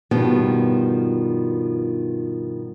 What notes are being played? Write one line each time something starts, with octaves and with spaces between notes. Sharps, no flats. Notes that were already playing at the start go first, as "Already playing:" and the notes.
G2 B2 D#3 F3 G3 B3